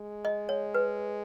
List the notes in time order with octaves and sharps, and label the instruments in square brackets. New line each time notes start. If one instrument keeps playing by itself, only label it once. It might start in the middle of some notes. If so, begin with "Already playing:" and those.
Already playing: [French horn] G#3
[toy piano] D#5
C#5
B4